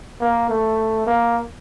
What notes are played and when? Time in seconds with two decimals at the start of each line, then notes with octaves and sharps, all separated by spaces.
0.21 A#3
0.49 A3
1.07 A#3